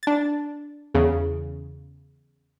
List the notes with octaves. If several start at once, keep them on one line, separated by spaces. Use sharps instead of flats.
D4 A6
E2 C#3